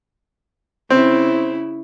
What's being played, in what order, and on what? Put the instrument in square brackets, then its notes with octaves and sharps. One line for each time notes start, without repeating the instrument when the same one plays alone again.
[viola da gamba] C#3 E4 [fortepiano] C4